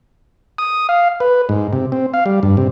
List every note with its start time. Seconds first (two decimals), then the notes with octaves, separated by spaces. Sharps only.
0.58 D#6
0.89 F5
1.20 B4
1.49 G#2
1.73 C3
1.92 C4
2.14 F5
2.26 G3
2.43 G2
2.57 C3